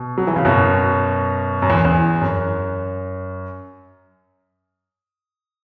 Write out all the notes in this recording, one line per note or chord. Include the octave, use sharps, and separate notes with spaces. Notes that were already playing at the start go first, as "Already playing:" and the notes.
Already playing: B2
F#3
E3
C#3
F#2 B2
F#2
E2
E2
F#2